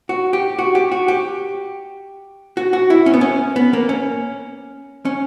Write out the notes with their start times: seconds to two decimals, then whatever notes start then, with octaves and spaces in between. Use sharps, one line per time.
0.09 F#4
0.33 G4
0.59 F#4
0.75 G4
0.92 F#4
1.08 G4
2.57 F#4
2.73 F#4
2.90 E4
3.06 C#4
3.14 B3
3.21 C#4
3.56 B3
3.73 A#3
3.89 C#4
5.05 C#4